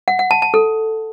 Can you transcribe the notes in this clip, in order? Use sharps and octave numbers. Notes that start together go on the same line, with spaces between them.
F#5
F#5
A5
A5
A4